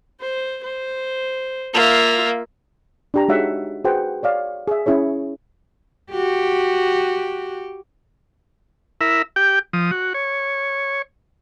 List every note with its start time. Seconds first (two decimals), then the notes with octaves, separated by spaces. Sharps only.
0.20 C5
0.63 C5
1.74 A#3 F4 E5
3.14 D4 G4 A#5
3.28 G#3 D#4 F#4 C#5 E5 F#5
3.84 F#4 G#4 B4 C5 F#5 G5
4.23 C#5 D5 F5
4.68 G#4 E5
4.86 C#4 E4 G#4 C#5
6.11 F#4 G4
9.01 E4 A#4 E5
9.36 G4 G5
9.73 F3 D#6
9.91 F#4
10.14 C#5